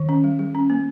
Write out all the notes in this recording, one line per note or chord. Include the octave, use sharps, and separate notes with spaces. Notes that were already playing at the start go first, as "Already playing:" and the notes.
Already playing: D#3
C#4
G3
G3
C#4
A#3